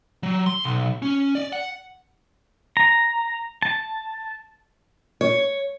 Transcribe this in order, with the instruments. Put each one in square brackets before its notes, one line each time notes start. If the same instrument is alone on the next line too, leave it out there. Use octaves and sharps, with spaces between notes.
[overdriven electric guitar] F#3
C6
B1
C#4
D5
F#5
[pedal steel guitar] A#5
A5
[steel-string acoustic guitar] C#5